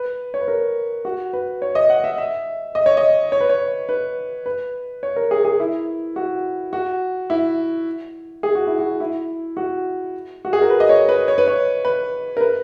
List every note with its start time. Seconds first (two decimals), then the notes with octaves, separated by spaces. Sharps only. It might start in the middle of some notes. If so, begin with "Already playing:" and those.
Already playing: B4
0.34 C#5
0.41 B4
0.48 A#4
1.05 F#4
1.33 B4
1.62 C#5
1.75 D#5
1.90 F#5
2.04 E5
2.18 E5
2.75 D#5
2.86 C#5
2.97 D#5
3.32 C#5
3.41 B4
3.49 C#5
3.89 B4
4.46 B4
5.03 C#5
5.16 A#4
5.31 G#4
5.45 G#4
5.60 E4
6.16 F#4
6.73 F#4
7.30 E4
8.43 G#4
8.55 F#4
8.67 E4
8.78 F#4
9.00 E4
9.57 F#4
10.45 F#4
10.53 G#4
10.62 A#4
10.70 B4
10.80 D#5
10.89 C#5
11.09 B4
11.28 C#5
11.38 B4
11.48 C#5
11.85 B4
12.37 A#4
12.41 B4